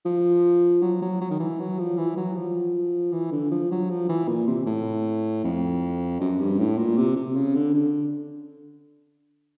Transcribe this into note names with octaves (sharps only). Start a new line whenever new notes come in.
F3
F#3
F#3
F#3
D#3
E3
F#3
F3
E3
F#3
F3
E3
D3
F3
F#3
F3
E3
A#2
C3
A2
F2
F#2
G2
A2
A#2
C3
C3
C#3
D3
D3